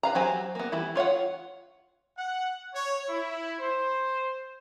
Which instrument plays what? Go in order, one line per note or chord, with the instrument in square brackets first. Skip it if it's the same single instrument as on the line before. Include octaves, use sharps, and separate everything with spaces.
[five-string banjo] B4 F5 A#5
F#3 G4 C5 G#5
A#3 B3
E3 G3 E4
F4 C#5 F5 F#5
[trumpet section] F#5
C#5
E4
C5